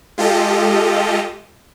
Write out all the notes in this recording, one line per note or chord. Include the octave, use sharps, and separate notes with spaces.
G#3 F4 G4 A4 D#5